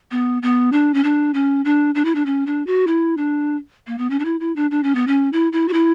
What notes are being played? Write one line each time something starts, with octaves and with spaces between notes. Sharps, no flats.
B3
B3
D4
C#4
D4
C#4
D4
D4
E4
D4
C#4
D4
F#4
E4
D4
A#3
B3
C#4
D4
E4
E4
D4
D4
C#4
B3
C#4
E4
E4
F#4
E4